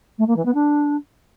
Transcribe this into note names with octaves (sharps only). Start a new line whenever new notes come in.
A3
A#3
E3
B3
D4